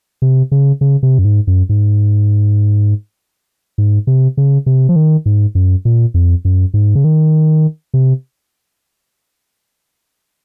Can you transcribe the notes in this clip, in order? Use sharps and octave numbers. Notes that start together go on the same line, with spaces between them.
C3
C#3
C#3
C3
F#2
G#2
F#2
G#2
G#2
C3
C#3
C3
F3
D#3
G#2
F#2
A#2
F2
F#2
G#2
C#3
D#3
C3